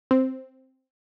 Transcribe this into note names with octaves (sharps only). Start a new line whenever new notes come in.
C4